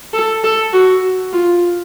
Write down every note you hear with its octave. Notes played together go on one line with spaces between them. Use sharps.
A4
A4
F#4
F4